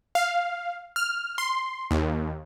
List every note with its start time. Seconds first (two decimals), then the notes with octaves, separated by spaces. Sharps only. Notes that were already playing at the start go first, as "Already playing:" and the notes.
0.15 F5
0.96 F6
1.38 C6
1.91 D#2